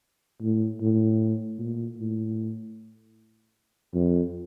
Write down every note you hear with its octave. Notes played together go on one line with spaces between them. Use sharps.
A2
A2
A#2
A2
F2